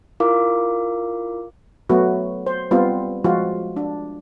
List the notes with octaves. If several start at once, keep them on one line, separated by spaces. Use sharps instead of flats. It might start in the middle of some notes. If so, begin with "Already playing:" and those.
E4 F4 A#4 F5 D6
F#3 A3 B3 F#4
C5
G3 B3 C4 F4
F3 G#3 F4 F#4
D4